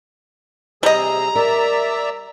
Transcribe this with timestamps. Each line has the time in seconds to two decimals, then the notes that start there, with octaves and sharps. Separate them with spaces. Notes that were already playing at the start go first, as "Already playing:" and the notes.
0.83 C3 G3 G#4 D#5 A#5 E6
1.35 A#4 D5 E5 E6